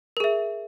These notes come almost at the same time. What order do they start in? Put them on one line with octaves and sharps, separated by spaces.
A#4 G#4 E5